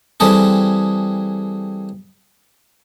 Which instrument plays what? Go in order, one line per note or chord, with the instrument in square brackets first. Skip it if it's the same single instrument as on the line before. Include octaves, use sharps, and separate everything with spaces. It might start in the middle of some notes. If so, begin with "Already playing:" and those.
[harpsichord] E3 G3 C4 G#4 A4